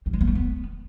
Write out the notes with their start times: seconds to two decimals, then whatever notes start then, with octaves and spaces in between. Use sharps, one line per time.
0.06 G3
0.13 G#3
0.21 A#3
0.28 A3
0.35 B3